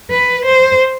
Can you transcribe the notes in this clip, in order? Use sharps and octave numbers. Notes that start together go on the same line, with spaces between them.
B4
C5